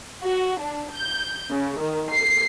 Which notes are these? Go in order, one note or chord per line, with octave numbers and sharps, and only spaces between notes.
F#4
D4
G6
C#3
D#3
C7